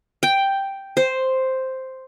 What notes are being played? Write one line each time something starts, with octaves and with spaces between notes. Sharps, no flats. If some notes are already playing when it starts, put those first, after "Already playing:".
G5
C5